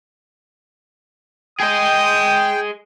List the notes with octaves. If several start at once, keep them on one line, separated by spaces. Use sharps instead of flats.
G#4 D#5 G5 D#6